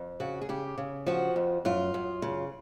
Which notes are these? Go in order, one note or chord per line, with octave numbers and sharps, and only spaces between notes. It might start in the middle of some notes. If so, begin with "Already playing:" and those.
Already playing: F2
C#3 F#4
G#4
C#3 G4
C#3
F3 F#4
F2
F#2 F4
F#2
C#3